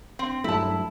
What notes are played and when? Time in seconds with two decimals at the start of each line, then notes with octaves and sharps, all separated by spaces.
0.19 C4
0.44 G2 F#3 A3 E4 A5